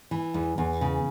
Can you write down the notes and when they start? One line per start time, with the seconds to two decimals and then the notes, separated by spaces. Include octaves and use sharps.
0.11 E3
0.34 E2
0.58 E2
0.81 C#3